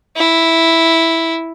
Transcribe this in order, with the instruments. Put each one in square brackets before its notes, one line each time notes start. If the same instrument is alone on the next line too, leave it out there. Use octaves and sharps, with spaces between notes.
[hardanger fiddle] E4